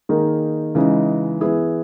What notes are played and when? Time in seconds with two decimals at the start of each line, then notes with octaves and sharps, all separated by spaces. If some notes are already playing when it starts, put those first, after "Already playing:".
0.09 D#3 A#3 D#4 G#4
0.75 C#3 E3 G#3 D#4
1.41 E3 B3 E4 G#4